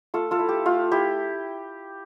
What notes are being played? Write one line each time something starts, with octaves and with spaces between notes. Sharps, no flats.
A3 F4 A4
F4 A4
E4
G4
A3 F4
E4 G4